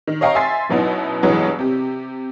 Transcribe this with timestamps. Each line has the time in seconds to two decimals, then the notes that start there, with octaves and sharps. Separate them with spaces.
0.07 D#3
0.21 C#5 D#5 F5 G5 A#5 C#6
0.35 E5 G#5 C6 A6 C7
0.70 F#2 B2 F#3 B3 D#4 E4
1.23 G2 B2 E3 F#3 G#3 B3
1.59 C3 G4